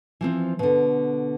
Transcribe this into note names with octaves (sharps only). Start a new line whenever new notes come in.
E3 F3 C4
B2 D3